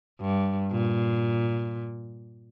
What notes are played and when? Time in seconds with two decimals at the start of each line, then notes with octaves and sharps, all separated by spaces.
0.21 G2
0.72 A#2